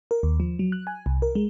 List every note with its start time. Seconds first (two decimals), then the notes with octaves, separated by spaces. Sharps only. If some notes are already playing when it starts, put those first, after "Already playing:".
0.11 A#4
0.23 D#2
0.40 F3
0.59 F#3
0.72 F#6
0.87 G#5
1.06 C2
1.22 A#4
1.35 G#3